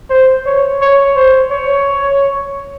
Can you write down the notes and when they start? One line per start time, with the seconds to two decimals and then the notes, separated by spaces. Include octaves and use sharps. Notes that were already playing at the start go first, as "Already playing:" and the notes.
0.10 C5
0.46 C#5
0.81 C#5
1.16 C5
1.51 C#5